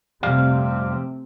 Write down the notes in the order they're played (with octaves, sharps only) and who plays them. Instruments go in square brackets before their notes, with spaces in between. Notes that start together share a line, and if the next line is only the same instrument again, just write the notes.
[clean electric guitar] F2 G3 F5 [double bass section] C3 A3 C4